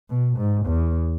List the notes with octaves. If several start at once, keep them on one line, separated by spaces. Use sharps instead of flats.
B2
G#2
E2